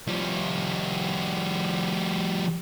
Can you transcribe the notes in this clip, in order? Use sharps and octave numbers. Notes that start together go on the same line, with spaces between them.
F3 G3